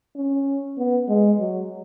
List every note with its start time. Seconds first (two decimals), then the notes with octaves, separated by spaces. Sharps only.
0.16 C#4
0.78 B3
1.09 G#3
1.39 F#3